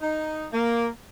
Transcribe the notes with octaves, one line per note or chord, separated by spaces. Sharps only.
D#4
A#3